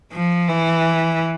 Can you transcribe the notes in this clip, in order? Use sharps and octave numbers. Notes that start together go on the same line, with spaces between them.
F3
E3